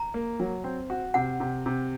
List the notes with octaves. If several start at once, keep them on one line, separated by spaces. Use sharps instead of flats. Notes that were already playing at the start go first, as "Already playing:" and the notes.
Already playing: A#5
A#3
F#3
C4
F#4
C3 F#5
C3
C3